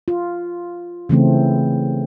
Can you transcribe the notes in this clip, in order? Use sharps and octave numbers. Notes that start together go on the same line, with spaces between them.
F4
C#3 E3 A3 C4